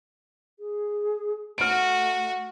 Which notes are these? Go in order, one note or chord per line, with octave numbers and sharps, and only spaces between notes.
G#4
A3 F#4 F6 D7